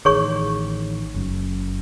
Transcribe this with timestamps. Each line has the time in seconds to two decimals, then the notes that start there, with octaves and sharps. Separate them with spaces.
0.05 A1 D#3 G#4 C#5 C#6
1.14 F#1 F#2